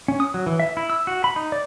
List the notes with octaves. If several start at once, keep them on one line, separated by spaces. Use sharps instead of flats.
C#4
D#6
F#3
E3
E5
E4
E6
F#4
B5
D#4
D5